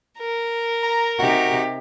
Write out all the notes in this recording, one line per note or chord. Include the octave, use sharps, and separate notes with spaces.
A#4
A#5
C3 D#4 F#4 G4